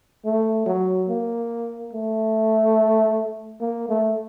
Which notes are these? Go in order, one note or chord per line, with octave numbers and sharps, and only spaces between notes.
A3
F#3
A#3
A3
A#3
A3